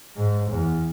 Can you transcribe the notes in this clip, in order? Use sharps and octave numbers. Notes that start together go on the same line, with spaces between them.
G#2
E2